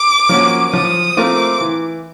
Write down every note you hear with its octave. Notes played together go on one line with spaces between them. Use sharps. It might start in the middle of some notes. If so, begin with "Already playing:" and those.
Already playing: D6
F3 A#3 C#4 F#4
F3 D#6
A3 C4 F4 A#4 D6
E3